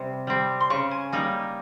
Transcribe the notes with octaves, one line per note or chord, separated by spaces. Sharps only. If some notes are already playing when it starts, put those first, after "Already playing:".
Already playing: C3 G3 C4
G3 C4
C6
C#3 C#6
G#5
G3 A#3 D#4 D#6